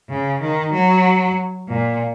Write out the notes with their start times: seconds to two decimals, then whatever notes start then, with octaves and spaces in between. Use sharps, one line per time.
0.09 C#3
0.41 D#3
0.73 F#3
1.68 A#2